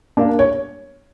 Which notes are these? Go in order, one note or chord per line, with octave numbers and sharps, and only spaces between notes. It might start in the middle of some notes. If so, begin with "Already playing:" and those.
A#3 D4
C#5